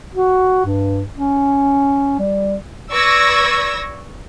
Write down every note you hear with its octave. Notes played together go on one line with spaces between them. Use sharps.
F#4
G2
C#4
G3
B4 D5 C#6 E6 G#6 A#6